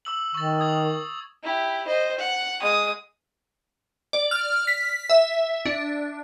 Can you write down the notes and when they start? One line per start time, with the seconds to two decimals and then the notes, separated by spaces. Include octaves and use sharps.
0.05 D6 E6 F#7
0.34 D#3 C#6 A6
0.60 D#6 G#6 F#7
1.43 E4 G4
1.87 C5 D#5
2.18 F#5
2.62 G#3 D#6
4.13 D5
4.31 F6
4.67 B6
5.10 E5
5.65 D4